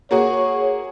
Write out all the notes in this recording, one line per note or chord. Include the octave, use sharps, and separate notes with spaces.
A#3 F#4 G#4 C#5